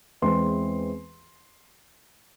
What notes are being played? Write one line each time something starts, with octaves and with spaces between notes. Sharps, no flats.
E2 E3 G#3 C4 C6